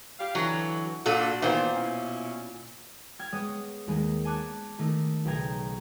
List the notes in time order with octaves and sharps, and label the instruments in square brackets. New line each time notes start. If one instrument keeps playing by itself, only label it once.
[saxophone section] G4 F5
[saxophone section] D3 E3 [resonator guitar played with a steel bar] F#3
[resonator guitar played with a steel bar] A#2 A4 [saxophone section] D4 F#4
[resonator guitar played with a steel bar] A#2 C5 [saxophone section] D#3 E3 B3
[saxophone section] B2 C#4 E4
[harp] G5 F6 G#6 A6
G#3 B3 C#5 D#6
D#2 D#3 G#3 D#4
G#5 A5 D6 F#6 C#7
D#3 A3 D#4
B1 C#3 G5 A#5 G#6